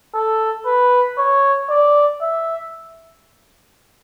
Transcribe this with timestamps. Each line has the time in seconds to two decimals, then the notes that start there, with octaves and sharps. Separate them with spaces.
0.14 A4
0.65 B4
1.18 C#5
1.69 D5
2.22 E5